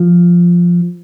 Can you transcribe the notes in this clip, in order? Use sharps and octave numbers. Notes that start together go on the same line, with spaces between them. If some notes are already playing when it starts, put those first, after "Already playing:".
Already playing: F3